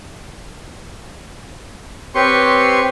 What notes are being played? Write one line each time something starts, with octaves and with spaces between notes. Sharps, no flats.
C4 G4 B4 C#5 C6 C#6